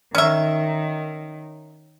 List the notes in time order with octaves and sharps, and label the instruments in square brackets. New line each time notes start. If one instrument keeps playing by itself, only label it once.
[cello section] D#3 [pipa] C#4 E5